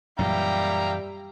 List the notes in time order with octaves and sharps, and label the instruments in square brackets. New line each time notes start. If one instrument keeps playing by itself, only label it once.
[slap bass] F#2 A#2 E3 [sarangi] G3 [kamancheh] E5 G5 [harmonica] F5 A#5